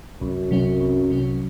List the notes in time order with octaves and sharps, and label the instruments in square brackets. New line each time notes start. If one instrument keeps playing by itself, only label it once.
[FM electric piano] C2 [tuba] F#2
[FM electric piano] C3 F#3 C#4
C2
C3 F#3 C#4